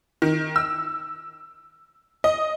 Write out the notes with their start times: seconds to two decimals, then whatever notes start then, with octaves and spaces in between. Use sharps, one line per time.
0.22 D#3
0.56 E6
2.24 D#5